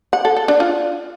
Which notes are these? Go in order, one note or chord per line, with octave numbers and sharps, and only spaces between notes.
F#5
A4
A4
D4
F4